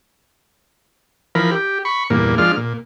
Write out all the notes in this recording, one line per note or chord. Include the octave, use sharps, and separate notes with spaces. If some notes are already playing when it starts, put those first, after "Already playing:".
E3 F3 A#4 B5
G4
B5 C#6
E2 G2 A#2 A#3
F3 G#3 D4 F4 F6
A#2